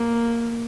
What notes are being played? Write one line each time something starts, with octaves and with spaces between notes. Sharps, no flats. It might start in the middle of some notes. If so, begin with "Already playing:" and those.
Already playing: A#3